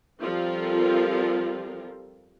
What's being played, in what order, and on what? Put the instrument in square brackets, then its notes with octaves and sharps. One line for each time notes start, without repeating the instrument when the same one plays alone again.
[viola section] F3 G3 C4 F4 A4 A#4